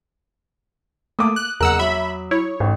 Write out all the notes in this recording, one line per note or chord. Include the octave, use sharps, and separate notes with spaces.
A3 A#3 D6 D#6
F#6
F#1 E2 A#4 F#5 E6 F#6
F#3 E5 B5
E4 C#5
A1 G#2